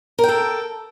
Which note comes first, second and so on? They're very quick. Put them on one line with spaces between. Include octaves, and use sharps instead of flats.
A#4 G5 A4